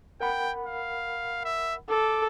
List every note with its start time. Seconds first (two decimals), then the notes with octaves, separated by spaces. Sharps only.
0.20 A#4 F#5 G5 B5
0.66 F5
1.45 E5
1.89 A4 D6